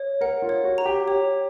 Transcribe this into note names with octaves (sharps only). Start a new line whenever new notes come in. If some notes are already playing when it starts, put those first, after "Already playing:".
Already playing: C#5
A#4 F#5
F4
C#5
F#4
A#5
G4
G4 C#5